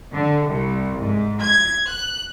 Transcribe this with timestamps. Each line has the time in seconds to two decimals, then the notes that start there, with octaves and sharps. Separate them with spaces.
0.12 D3
0.48 C2
1.00 G#2
1.42 G#6
1.88 F#6